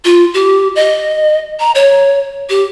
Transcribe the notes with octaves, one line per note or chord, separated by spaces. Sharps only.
F4
G4
D#5
A#5
C#5
G4